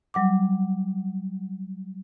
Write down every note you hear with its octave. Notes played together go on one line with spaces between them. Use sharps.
F#3 G3 F#5 D6